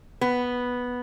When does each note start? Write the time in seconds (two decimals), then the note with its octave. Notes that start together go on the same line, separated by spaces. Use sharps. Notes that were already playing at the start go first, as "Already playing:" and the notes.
0.21 B3